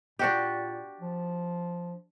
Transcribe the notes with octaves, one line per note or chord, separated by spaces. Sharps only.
A#2 D4 F#4 G4
F3